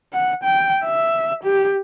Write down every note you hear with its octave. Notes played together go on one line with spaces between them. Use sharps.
F#5
G5
E5
G4